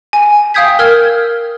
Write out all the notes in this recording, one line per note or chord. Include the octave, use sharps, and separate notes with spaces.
G#5
F5 G5 D#6 G6 G#6 B6
A#4 E6 F6 G#6